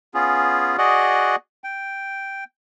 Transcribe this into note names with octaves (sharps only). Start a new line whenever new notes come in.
B3 C#4 F4 G#4
F#4 G#4 D5 D#5 F#5
G5